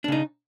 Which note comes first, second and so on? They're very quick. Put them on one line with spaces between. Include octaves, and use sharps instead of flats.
D4 C#3 D#4